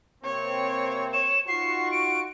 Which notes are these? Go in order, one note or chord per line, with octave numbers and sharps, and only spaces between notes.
C3 A#3 C4 C#5
C#5 E7
D#4 F4 F#4 C#6 C7
D7